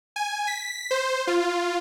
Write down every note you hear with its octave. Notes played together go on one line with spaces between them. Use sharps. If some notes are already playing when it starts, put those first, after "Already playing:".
G#5
B6
C5
F4